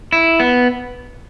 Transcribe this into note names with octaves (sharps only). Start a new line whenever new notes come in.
E4
B3